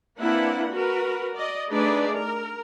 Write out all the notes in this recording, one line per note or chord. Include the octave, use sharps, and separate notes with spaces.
A#3 C4 D4 E4 B4 F#5
F#4 A#4 B4
D5 D#5
A3 D4 D#4 G#4 B4 D5
A#4